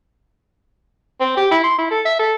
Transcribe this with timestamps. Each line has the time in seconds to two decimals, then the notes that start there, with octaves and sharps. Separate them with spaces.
1.20 C4
1.37 G4
1.51 E4
1.63 C6
1.78 E4
1.91 A4
2.05 E5
2.19 A4